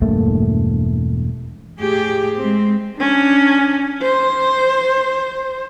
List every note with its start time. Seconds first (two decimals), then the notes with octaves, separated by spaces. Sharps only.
0.01 E1 G2 A3 A#3
1.78 A2 A3 G4 G#4
2.39 G#3 C4
2.97 C#4 D4
4.02 C5